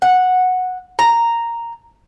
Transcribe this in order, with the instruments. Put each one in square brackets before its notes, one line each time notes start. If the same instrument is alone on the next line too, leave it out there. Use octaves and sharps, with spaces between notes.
[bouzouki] F#5
A#5